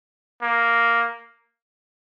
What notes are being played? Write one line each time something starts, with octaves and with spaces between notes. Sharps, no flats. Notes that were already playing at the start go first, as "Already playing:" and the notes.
A#3